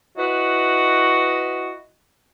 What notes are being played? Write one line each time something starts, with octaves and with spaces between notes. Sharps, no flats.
E4 F#4 B4 D#5